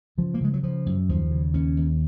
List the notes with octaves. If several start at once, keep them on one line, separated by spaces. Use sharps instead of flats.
C#3 F3
A#3
C#3 G#3
F#3
C#3 F3
F#2
D#2 F3
C#3
D#2 C#4
D#2